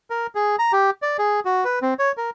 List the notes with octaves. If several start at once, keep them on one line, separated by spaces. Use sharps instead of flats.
A#4
G#4
A#5
G4
D5
G#4
F#4
B4
C4
C#5
A#4